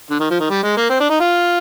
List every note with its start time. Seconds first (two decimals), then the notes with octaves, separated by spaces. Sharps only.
0.10 D3
0.20 D#3
0.30 F3
0.40 D#3
0.50 G3
0.63 G#3
0.77 A#3
0.90 C4
1.00 D4
1.10 D#4
1.20 F4